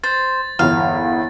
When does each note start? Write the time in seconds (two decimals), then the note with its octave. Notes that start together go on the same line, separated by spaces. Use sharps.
0.04 C5 A6
0.59 G1 E2 F5